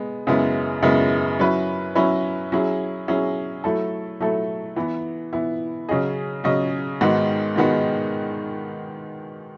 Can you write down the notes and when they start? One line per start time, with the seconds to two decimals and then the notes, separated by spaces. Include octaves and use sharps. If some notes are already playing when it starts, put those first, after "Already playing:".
Already playing: G#3 B3
0.27 F#2 C#3 G#3 B3 E4
0.83 F#2 C#3 G#3 B3 E4
1.39 F#3 C#4 E4 B4
1.95 F#3 C#4 E4 B4
2.52 F#3 C#4 E4 G#4
3.08 F#3 C#4 E4 G#4
3.64 F#3 A3 E4 A4
4.20 F#3 A3 E4 A4
4.76 E3 B3 E4
5.33 E3 B3 E4
5.89 C#3 F#3 C#4 G#4 D#5
6.44 C#3 F#3 C#4 G#4 D#5
7.01 G#2 D#3 G#3 B3 F#4
7.56 G#2 D#3 G#3 B3 F#4